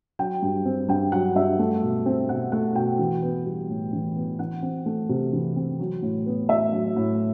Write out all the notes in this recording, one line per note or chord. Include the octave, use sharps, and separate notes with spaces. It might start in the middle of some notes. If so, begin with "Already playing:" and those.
F#3 G5
G2
C4
G2 G5
F#3 F#5
G2 E5
A3
B2
C4
B2 F#5
A3 F#5
B2 G5
E3
B3
G3
A2
E3
B3
E3 F#5
C4
A3
C3
E3
C4
F#3
A2
B3
A2 E5
F#3
A2